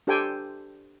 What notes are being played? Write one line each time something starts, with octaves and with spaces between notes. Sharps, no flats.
D4 G4 A4 C5 G5 G#5